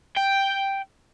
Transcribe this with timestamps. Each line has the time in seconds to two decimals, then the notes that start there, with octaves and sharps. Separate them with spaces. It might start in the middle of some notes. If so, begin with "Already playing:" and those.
0.16 G5